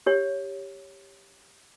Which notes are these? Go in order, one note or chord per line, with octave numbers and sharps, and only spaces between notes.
G4 C#5